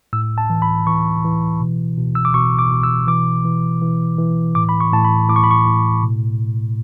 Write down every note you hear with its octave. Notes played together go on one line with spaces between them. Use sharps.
A2 E6
A5
E3
B5
E3 C#6
E3
B2
B2
E6
D6
B2 C#6
D6
B2
E6
E3 D6
E3
E3
E3
A2 D6
B5
C#6
A2 A5
B5
A2 D6
C#6
B5
C#6
A2
B2